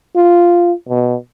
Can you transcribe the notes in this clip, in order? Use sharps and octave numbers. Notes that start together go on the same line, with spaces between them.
F4
B2